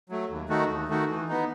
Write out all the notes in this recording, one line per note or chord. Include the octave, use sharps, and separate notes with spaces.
F#3 A3
D#2
D#3 A3 D#4 F#4
D#2
D#3 A3 D#4 F#4
E3
B3 D#4